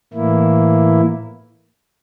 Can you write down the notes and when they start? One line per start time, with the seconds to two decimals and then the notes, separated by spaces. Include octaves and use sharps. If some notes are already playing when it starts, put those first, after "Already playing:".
0.13 A2 E3 A#3 E4